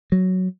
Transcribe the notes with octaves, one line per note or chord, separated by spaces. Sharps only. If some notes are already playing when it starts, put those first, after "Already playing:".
F#3